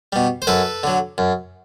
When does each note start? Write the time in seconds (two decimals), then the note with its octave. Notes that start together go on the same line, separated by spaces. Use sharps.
0.13 B2 G3
0.42 C5
0.47 F#2 A4 B4
0.83 D3 F#3
1.18 F#2